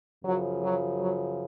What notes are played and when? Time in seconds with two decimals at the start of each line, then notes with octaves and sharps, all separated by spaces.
0.24 F#2 C#3 F3 F#3
0.62 F#3
0.99 F#3